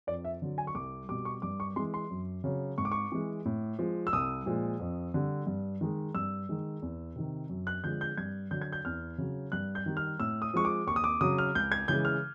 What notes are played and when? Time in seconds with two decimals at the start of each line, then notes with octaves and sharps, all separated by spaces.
0.07 F2 D5
0.25 E5
0.42 D3 F#3
0.58 G#5
0.67 C#6
0.75 C2 D6
1.09 B2 G3 D6
1.25 C#6
1.42 G2 D6
1.60 C#6
1.76 E3 G#3 C6
1.94 C6
2.10 F#2
2.44 C#3 F#3
2.78 G#2 C#6
2.85 D6
2.92 C#6
3.12 E3 G#3
3.45 A2
3.79 F3 G#3
4.07 E6
4.13 C2 D#6
4.46 A#2 F3 G#3
4.80 F2
5.14 D3 G3
5.47 G2
5.81 D#3 G#3
6.14 G2 E6
6.49 D#3 G#3
6.82 E2
7.16 C3 D#3
7.49 F#2
7.67 F#6
7.84 D3 F3 G#3 G6
8.01 G6
8.17 G2 G#6
8.51 D3 F#3 G6
8.61 G#6
8.72 G6
8.85 E2 F6
9.18 C#3 F#3
9.52 G2 F#6
9.75 G6
9.86 D#3 G3
9.97 F6
10.20 A2 E6
10.42 D#6
10.54 F3 G#3 C#6
10.65 D6
10.87 D#2 C#6
10.96 D#6
11.04 D6
11.21 C#3 F#3 D#6
11.38 F6
11.55 C#2 G6
11.72 G#6
11.88 C#3 E3 G#3 G6
12.05 F6